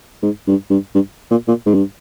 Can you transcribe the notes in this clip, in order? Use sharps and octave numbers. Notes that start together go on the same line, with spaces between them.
G#2
G2
G2
G2
A#2
A#2
G#2
G2